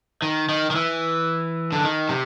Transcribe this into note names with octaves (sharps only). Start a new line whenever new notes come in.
D#3
D#3
D#3
E3
D3
D#3
C3